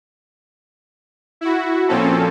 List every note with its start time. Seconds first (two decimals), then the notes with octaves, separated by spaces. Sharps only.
1.41 E4 F#4
1.88 A#2 F3 C4 C#4 A4